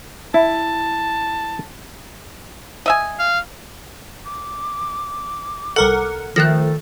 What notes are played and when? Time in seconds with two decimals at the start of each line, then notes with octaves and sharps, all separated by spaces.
0.34 E4 A5
2.86 D#5 E5 G#5
3.19 F5
4.25 D6
5.76 C2 A4 A#4 F#5
6.36 D#3 F3 A3 A4 F#6 A#6